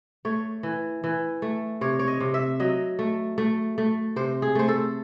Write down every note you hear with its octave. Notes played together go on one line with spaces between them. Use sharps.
A3 C#5
E3
E3
A3
C3 C#5
C#5
D#5
C3
E5
F#3 D#5
A3
A3
A3
C3 C5
G#4
A3 C5
A4